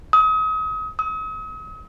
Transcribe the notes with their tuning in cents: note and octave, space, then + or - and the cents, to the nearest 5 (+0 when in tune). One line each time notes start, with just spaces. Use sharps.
D#6 +35
D#6 +45